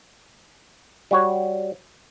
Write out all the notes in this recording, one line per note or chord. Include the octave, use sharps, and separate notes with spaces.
G3 F#4 C#5